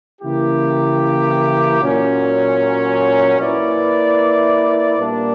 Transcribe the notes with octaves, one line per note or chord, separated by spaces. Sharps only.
C#3 E3 A#3 E4 G4
A#2 F#3 C#4
A#3 E4 B4 D5
A#2 G3 A#3 D4